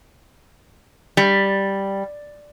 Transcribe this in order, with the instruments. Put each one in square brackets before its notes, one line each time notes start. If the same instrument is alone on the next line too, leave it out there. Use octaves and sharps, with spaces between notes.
[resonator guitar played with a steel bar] G3